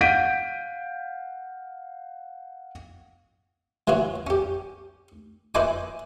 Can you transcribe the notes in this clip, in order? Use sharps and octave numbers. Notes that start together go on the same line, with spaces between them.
F5 F#5 G6 B6 D7 D#7
E3 F#3 F4 F#4 C#5
C#4 G4
E4 B4 C5 D#5 G#5 D6